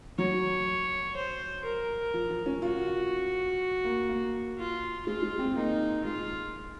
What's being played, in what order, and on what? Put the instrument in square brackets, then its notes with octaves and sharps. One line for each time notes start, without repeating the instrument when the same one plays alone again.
[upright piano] F#3 [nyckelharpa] C#5
[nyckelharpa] C5
A#4
[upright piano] F3
F3
C#4
[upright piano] F4 [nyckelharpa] F#4
[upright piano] A#3
A#3
[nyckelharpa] F4
[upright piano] G#3 [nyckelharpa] F4
[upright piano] G#3
C4
[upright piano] A#3 [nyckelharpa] D#4
[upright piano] G#3 [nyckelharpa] F4